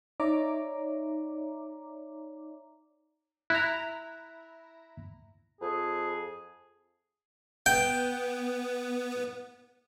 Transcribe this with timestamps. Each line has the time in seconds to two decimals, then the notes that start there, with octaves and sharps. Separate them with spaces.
0.20 D#4 C#5 D5 E5 A#5 D6
3.50 E4 A#5 F#6
5.61 F2 G#4
7.66 B3 G5